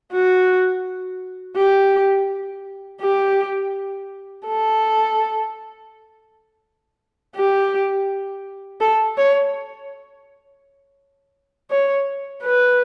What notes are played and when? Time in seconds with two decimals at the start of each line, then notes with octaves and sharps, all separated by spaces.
0.12 F#4
1.56 G4
3.01 G4
4.46 A4
7.36 G4
8.80 A4
9.17 C#5
11.70 C#5
12.43 B4